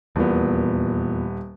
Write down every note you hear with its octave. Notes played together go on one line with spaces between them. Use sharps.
D#1 E2 A#2 B3